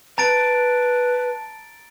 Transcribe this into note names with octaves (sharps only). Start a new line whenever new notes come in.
B4 A5 A#5 A6 D7